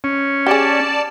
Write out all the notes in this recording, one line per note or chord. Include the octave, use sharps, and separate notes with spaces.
C#4
G4 G#4 D5 A5